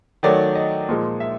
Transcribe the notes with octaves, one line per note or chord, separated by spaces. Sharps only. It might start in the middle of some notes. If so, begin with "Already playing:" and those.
D#3 F#3 A3 D5
D#5
A#2 F3 G#3
E5